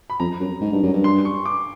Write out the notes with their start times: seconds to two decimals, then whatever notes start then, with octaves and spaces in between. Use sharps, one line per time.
0.10 B5
0.20 F2 A#5
0.40 F#2
0.61 G#2
0.72 G2
0.82 F#2
0.93 G2
1.04 C6
1.25 C#6
1.45 D6